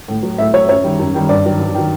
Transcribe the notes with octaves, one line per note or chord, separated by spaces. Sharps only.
A2
F#3
A2 E5
F#3 C#5
F#2 C#5
D#3 G3
F#2
D#3 G3
G2 D5
D#3 F#3
G2
D#3 F#3